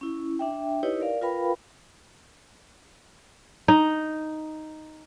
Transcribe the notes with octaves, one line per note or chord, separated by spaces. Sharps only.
C#4 E4
D4 E5 G5
D#4 E4 G4 B4 C#5 D#5
A#4 D5 F5
F4 A#4 B4 F5 G5 B5
D#4